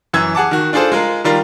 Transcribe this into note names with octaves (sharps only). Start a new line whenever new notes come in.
F#2 E3 E6 G#6
G#4 F#5 A5 D6
D#3 F#4
D4 F4 G#4 A4 C5
G#3 F4 A#4
D#3 G3 F4 A#4